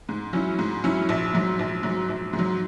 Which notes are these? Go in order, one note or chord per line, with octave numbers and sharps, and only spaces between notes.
G#2
F#3 C#4 E4
G#2
F#3 C#4 E4
A#1
G#2 F#3
A#1
G#2 F#3
A#1
G#2
F#3